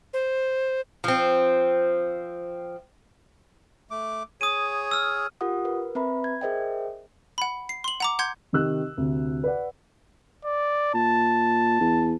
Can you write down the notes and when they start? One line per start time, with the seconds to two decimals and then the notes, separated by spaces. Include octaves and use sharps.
0.13 C5
1.04 F3 C4
3.91 A3 D6
4.41 G#4 C#5 D#6 D#7
4.91 E6 F6
5.41 F4 G4 A#4 F#5 D#6
5.65 A#4 B4
5.95 C4 B4 E5 A#5 B5
6.24 G#6
6.41 G#4 A#4 C5 D#5 E5 G5
7.38 F#5 B5
7.69 C7
7.84 C6 F#7
8.00 F#5 A#5 D6
8.19 F#5 C6 G6 G#6
8.53 C3 D#3 G4 E6 F#6
8.97 D2 C3
9.44 B4 D5 F#5
10.45 D5
10.94 A#2 A5
11.81 E2